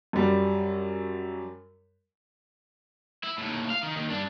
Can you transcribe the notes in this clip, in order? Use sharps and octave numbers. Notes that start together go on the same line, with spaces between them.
F#2 G3
E4
D#2 A2
F5
D#3
D#2 D#3
G2 D4